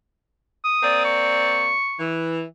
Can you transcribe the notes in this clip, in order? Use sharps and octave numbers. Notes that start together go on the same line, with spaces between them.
D#6
A#3 C4 D5
C#6
E3